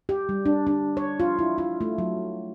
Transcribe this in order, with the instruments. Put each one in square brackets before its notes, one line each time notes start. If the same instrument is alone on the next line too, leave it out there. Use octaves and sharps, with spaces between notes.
[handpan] G4
G3
D4
D4
C#5
F4
E4
F4
A3
F#3